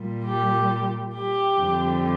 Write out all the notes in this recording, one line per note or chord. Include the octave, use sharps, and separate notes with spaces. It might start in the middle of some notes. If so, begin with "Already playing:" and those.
Already playing: A#2 G3
G4
G4
F2 D3 G3